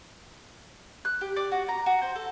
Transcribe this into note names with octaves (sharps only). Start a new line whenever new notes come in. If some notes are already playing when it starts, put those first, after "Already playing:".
F#6
G4
D5
F#4
A#5
F#4
C5
A4